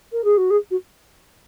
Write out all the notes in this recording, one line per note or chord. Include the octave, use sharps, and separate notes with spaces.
A#4
G#4
F#4
G#4
F#4